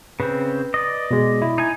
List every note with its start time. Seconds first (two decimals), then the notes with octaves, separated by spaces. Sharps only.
0.20 C#3 C4 B4
0.74 D5 D#5
1.11 B2 G#3
1.42 E4
1.58 D#4 G#5